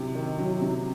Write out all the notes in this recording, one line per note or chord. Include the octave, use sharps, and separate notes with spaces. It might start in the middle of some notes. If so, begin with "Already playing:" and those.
Already playing: C3 F#3
D#3
F#3
C3